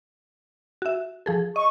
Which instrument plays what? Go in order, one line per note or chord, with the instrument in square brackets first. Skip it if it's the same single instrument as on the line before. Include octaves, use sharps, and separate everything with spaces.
[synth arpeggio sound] F#4 E5
F3 G#4 A4
[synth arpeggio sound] D#5 [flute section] C#6